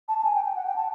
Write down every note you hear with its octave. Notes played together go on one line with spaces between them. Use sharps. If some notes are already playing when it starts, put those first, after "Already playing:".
A5
A5
G#5
G5
G5
F#5
G5
A5